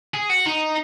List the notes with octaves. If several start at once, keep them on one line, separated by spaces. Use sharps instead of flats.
G#4
F#4
D#4